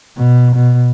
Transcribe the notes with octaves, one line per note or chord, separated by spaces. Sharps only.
B2
B2